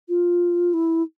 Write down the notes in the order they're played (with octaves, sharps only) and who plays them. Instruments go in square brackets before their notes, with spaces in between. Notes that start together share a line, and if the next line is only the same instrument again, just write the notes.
[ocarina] F4
E4